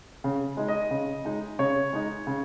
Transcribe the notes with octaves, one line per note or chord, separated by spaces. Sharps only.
C#3
G#3 D#4
D#5
C#3
G#3 D#4
C#3 C#5
G#3 D#4
C#3